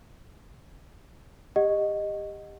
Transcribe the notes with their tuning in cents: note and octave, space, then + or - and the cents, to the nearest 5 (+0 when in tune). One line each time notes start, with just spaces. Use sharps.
G4 +25 D#5 -5 F#5 +0